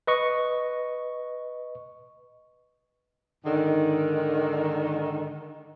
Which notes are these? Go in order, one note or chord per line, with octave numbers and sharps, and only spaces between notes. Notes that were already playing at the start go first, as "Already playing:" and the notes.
B4 D#5 C#6
G#2 D3 D#3